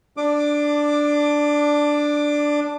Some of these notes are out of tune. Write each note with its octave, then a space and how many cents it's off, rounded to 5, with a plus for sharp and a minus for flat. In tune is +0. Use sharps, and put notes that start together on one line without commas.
D4 +0 D6 +20